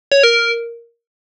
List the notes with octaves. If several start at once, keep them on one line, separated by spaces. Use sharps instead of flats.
C#5
A#4